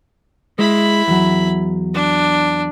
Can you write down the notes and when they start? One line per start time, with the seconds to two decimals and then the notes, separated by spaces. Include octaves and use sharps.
0.59 G#3 E4 B5
1.08 E2 F#3
1.94 D4